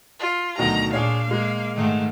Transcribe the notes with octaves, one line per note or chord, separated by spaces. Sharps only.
F4
D2 B2 D#3 F#3 A#5
A#2 D4 G#4 C#5 F5
G#3 A#3
G#2 D#3 A3